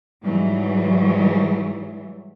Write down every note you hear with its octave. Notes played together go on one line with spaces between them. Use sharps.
G#2 E3 F#3 G3